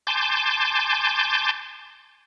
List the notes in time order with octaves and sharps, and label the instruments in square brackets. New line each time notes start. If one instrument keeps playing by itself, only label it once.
[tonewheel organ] G#5 A5 C6 D6 G6